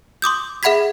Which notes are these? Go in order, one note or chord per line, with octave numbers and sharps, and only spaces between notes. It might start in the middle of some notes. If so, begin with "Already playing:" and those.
C6 D6 D#6 G6
G#4 E5 F#5 B5 G#6 B6